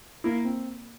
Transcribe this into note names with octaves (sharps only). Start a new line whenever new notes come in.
A#3 E4
C4